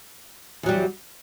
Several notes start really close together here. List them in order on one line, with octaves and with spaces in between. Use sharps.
E2 F#3 G3